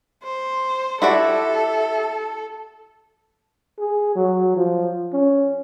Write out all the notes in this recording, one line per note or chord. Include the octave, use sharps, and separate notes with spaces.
C5
E4 F#4 G4 A4 D5 E5
G#4
F#3
F3
C#4